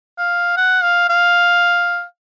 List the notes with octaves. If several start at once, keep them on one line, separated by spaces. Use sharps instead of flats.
F5
F#5
F5
F5